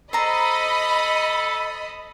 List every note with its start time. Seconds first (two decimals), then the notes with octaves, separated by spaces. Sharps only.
0.13 A4 C5 D#5 A#5 B5